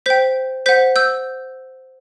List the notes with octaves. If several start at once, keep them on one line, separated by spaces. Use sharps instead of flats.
C5 G5 G6 B6
C5 F#5 G6 B6
E6 G6